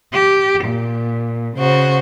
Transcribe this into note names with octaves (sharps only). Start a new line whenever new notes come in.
G4
A#2
C#3 F#4 C5